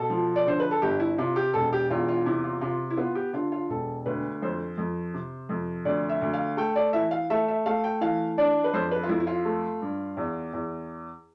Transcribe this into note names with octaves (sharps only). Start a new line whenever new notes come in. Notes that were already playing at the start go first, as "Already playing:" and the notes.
Already playing: B2 A4
F3
D5
D3 C5
B4
A4
G1 G4
E4
C3 F4
G4
E1 A4
G4
E2 F4
F4
C3 E4
F4
C3 F4
E4
B3 F4
G4
D3 F4
F4
E1 A4
D2 B4
F2 C5
F2
C3
F2
D2 D5
E5
D2
F5
A3 G5
D5
E3 E5
F5
A3 E5
E5
A3 F5
G5
E3 F5
D4 D5
B4
F2 C5
B4
F4
F2 E4
E4
F4
A3
G2
E2
E2